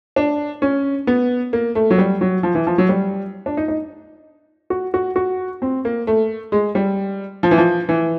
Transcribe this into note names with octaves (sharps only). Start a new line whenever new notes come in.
D4
C#4
B3
A#3
A3
F#3
G3
F#3
F3
E3
F3
F#3
G3
D4
D#4
D#4
F#4
F#4
F#4
C4
A#3
A3
G#3
G3
F3
E3
F3
E3